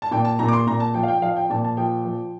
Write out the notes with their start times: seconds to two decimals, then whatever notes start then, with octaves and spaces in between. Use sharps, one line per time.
0.02 A5
0.11 A#2 G5
0.25 A5
0.39 A#2 A#5
0.48 D6
0.53 C6
0.67 A#2 A#5
0.80 A5
0.94 F3 G5
1.03 F5
1.08 G5
1.22 F3 F5
1.37 G5
1.50 A#2 A5
1.64 A5
1.77 F3 G5
2.05 F3